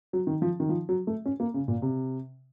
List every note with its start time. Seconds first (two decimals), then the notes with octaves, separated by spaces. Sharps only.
0.13 F#3
0.27 D#3
0.42 F3
0.60 D#3
0.69 F3
0.89 F#3
1.07 A3
1.26 C#4
1.40 A#3
1.54 C#3
1.68 A#2
1.82 C3